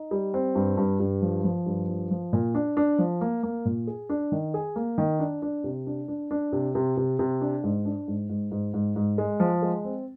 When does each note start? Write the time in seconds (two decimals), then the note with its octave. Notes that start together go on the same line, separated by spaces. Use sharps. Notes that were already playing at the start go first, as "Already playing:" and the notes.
Already playing: D#4
0.11 G3
0.34 C4
0.55 G2
0.77 G2
1.00 G2
1.22 F3
1.44 F3
1.66 G2
1.88 F3
2.11 F3
2.33 A#2
2.55 D4
2.77 D4
2.99 F3
3.21 A#3
3.43 A#3
3.65 A#2
3.87 G#4
4.09 D4
4.32 D#3
4.54 G#4
4.76 A#3
4.98 D#3
5.19 D4
5.42 D4
5.64 C3
5.87 D4
6.08 D4
6.31 D4
6.52 C3
6.75 C3
6.97 C3
7.19 C3
7.41 D4
7.64 G#2
7.85 D4
8.08 G#2
8.29 G#2
8.52 G#2
8.74 G#2
8.96 G#2
9.18 G#3
9.40 F3
9.62 G#3
9.85 C4